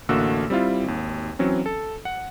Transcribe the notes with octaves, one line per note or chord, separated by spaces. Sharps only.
A1 D3 A3 A#3 F#4 E6
G3 C4 E4 F4
G#1 D#2
E3 F#3 C4 C#4
A4
F#5